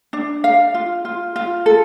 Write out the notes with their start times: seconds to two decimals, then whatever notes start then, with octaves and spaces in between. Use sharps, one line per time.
0.13 D4
0.44 F5
0.74 F4
1.05 F4
1.36 F4
1.66 A4